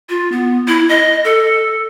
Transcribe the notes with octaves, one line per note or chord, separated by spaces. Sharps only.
F4
B3
E4
D#5
A4